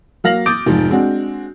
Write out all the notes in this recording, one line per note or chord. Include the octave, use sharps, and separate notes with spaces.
F#3 A#3 F5 F6 A#6 F#7
D6 D#6 G6 A6 D7
F1 G#2 F3
G#3 C4 D4 F#4